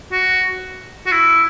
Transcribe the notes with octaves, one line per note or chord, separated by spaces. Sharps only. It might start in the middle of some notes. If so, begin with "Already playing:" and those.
F#4
F#4
E4